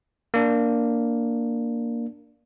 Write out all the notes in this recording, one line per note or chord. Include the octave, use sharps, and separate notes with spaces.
A#3 D4